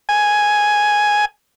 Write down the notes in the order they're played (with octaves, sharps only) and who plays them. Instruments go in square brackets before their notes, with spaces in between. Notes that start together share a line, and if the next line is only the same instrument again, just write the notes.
[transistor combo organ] G#5